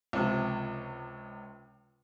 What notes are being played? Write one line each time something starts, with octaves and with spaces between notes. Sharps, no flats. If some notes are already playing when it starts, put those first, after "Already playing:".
C#2 C3 F3